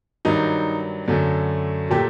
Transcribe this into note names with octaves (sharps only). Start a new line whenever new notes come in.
G2 D#3 F#3 D#4
F#2 D3 F#3 A3
A#2 F#3 A3 G4